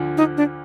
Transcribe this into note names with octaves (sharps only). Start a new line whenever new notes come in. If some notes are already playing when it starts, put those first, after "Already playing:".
Already playing: D2 D3 F3
D#4
D4